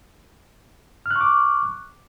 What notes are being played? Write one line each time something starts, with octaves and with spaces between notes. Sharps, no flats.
C#6 D6 F6 F#6